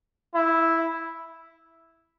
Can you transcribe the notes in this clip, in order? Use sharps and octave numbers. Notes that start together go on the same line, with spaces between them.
E4